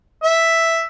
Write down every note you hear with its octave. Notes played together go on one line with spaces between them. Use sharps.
E5